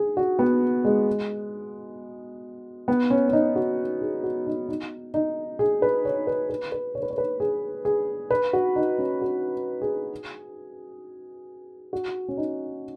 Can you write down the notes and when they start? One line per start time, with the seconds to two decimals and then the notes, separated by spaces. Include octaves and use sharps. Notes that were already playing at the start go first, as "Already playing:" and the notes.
Already playing: G#4
0.17 F#4
0.39 B3
0.85 G#3
2.88 B3
3.10 C#4
3.29 C#4
3.33 D#4
3.56 F#4
4.01 G#4
4.24 F#4
4.47 D#4
4.69 D#4
5.14 D#4
5.59 G#4
5.82 B4
6.05 C#5
6.27 B4
6.50 B4
6.72 B4
6.95 C#5
7.03 B4
7.10 C#5
7.18 B4
7.40 G#4
7.85 G#4
8.31 B4
8.53 F#4
8.76 D#4
8.98 C#4
9.22 F#4
9.82 G#4
11.93 F#4
12.28 C#4
12.37 D#4